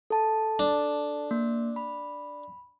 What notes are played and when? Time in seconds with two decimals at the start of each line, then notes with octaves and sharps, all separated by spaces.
0.10 A4 A5
0.59 D4
1.31 A#3
1.76 B5